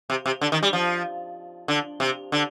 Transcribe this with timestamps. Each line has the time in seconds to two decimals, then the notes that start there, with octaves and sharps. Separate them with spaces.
0.10 C3
0.26 C3
0.41 D3
0.52 D#3
0.63 G3
0.73 F3
1.68 D3
2.00 C3
2.32 D3